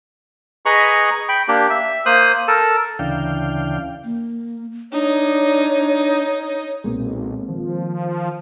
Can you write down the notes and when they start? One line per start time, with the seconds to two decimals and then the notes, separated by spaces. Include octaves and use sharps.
0.66 G#4 B4 D#5 A#5 B5 C#6
1.29 G5 B5
1.48 A#3 D4 G4
1.70 E5
2.06 A#3 C5 D#6 F#6
2.48 A4 A#4 E6
2.99 D2 C#3 E3 D4 F5 G5
4.04 A#3
4.92 D4 D#4 C#5
6.84 B1 A#2 G#3 A#3 C4
7.48 D#3 F3